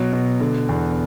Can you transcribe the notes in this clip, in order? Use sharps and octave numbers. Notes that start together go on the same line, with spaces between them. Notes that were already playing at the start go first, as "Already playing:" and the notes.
Already playing: B2 F#3
B2
D3
E2